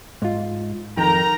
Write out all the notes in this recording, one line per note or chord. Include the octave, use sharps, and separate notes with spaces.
G#2 F4
F2 D#3 A#4 G5 A#5